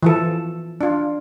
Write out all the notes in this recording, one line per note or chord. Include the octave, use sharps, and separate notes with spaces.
E3 F3 A4
D4 F4